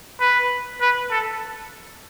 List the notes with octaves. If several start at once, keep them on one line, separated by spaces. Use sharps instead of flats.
B4
B4
A4